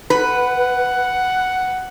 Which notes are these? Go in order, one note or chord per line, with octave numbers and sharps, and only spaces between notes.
B4 F#5